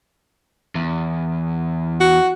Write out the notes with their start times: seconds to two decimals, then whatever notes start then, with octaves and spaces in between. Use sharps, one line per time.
0.75 E2
2.00 F#4